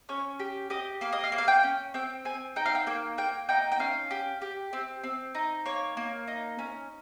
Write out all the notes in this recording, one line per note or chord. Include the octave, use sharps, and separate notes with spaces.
C#4 C#5
G4
G4 D#5
A#3 F5
D#5
F5
A#3
F5
G5
C#4
C4 G5
C4 G#5
D#4 G5
F5
G5
A#3 G5
A#3 G5
D#4 G5
G5
C#4 F5
G4
G4
C4
C4
D#4
A#3 C#5
A#3
D#4
C#4